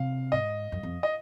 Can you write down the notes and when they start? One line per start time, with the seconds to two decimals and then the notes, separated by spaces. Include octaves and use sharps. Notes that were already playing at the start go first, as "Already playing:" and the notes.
Already playing: C3 F5
0.32 G#2 D#5
0.72 F#2
0.83 F2
1.03 D#5